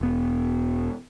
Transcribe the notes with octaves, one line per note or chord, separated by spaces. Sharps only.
E1 B3